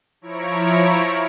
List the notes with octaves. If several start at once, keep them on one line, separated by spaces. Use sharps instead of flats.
F3 E4 C#5 A#5 C#6 D7